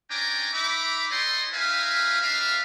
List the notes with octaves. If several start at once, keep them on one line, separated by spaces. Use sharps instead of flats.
C#4 D4 G5 G#5 A#5 D6
D#4 E5 A#5 B5 D6
E4 A4 C#5 D#5 G5 C6
D#4 A#4 B4 E5 F5 G#5
D4 A#4 B4 E5 F5